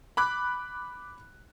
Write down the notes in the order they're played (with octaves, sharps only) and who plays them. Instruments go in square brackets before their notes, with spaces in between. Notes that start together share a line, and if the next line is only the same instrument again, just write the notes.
[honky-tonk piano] B5 D6 F#6